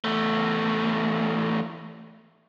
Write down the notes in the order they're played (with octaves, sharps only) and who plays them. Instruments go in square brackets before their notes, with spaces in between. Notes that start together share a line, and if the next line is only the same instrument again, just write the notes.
[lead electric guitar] E2 A3